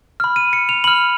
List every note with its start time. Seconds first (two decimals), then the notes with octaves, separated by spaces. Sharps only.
0.20 B5 F6
0.36 D#7
0.53 C#7
0.69 F7
0.84 B5 F6 F#7